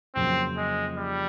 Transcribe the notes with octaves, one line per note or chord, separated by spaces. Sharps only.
F2 C#3 F#3 A#3 C4
G#3
G3